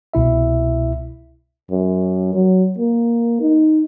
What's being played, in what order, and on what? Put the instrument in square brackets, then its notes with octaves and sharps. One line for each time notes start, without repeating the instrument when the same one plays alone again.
[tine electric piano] C2 B2 E4 E5
[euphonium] F#2
F#3
A#3
D#4